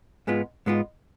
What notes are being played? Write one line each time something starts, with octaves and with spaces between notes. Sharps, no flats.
G#2 G#3 B3 F4
G#2 G#3 B3 F4